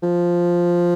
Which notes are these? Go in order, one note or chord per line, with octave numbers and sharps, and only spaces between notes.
F3